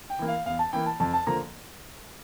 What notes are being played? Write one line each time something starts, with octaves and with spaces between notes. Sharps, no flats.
G5
E3 A#3
F5
E2 F5
A5
E3 A#3 G5
A5
F2 A5
A5
D3 F3 A#3 A#5